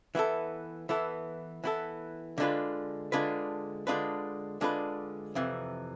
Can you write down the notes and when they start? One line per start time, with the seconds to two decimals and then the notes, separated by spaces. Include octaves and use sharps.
0.15 E3 B3 E4 A4
0.89 E3 B3 E4 A4
1.64 E3 B3 E4 A4
2.38 D3 G#3 D4 F4 B4
3.12 D3 G#3 D4 F4 B4
3.87 D3 G#3 D4 F4 B4
4.61 D3 G#3 D4 F4 B4
5.35 F2 C3 E3